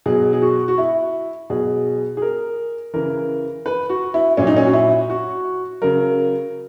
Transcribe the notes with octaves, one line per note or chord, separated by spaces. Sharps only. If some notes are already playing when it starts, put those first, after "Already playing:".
B2 F#3 G#4
G#4
F#4
F#4
E4
B2 F#3 G#4
G#4
A#4
C#3 E3 A#4
B4
F#4
E4
A#2 F#3 C#4
D#4
C#4
F#4
E4
F#4
C#3 F#3 A#4